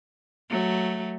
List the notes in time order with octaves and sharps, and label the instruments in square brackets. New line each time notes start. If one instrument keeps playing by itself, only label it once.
[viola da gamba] F#3 A3